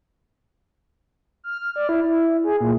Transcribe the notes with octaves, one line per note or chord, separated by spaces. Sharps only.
F6
F6
D5
E4
E4
G#4
A#2